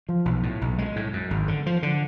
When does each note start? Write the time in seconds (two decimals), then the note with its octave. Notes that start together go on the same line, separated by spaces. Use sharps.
0.09 F3
0.25 B1
0.43 A2
0.61 B1
0.78 G#3
0.96 A2
1.13 F#2
1.31 G#1
1.48 D3
1.66 F3
1.83 D3